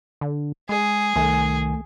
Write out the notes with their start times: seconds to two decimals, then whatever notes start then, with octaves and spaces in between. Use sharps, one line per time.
0.21 D3
0.69 G#3 G#4
1.16 C2 D#3 A3 G#5